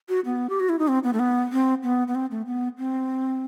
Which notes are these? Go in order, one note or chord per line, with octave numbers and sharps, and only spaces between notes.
F#4
B3
G4
F#4
E4
D#4
C4
B3
A3
B3
C4
B3
B3
C4
A3
B3
C4